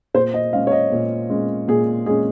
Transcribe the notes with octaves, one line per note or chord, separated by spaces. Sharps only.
A#2 C5
D#5
G#3 C#4 F5
C#5
D#5
A#2
G#3 C#4
A#2 G#4
G#3 C#4 G#4